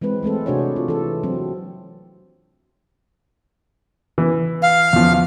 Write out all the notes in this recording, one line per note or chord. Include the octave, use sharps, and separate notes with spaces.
E3 G#3 C4 B4
G#3 A3 C4 A4
C3 D4 F#4 G#4 C5 C#5
F4
E3 A4
F#3 C4
E3
F5
E2 F3